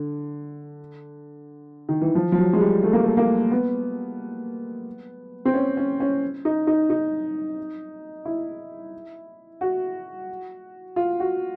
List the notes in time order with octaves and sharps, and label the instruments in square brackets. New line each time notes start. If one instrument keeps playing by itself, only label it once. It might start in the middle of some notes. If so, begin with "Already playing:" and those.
Already playing: [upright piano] D3
D#3
E3
F3
F3
F#3
G#3
G3
A3
A#3
A3
A#3
B3
C4
C#4
C#4
C#4
D#4
D#4
D#4
E4
F#4
F4
F#4